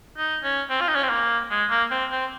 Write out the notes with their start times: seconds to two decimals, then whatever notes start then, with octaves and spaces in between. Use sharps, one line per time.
0.17 D#4
0.43 C#4
0.70 C4
0.81 F4
0.88 D#4
0.95 C#4
1.03 C4
1.10 A#3
1.50 G#3
1.70 A#3
1.91 C4
2.11 C4